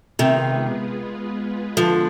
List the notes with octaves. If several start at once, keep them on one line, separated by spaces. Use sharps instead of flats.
C3 D#3 G#3 B3 F4 G#4 B4
D3 F3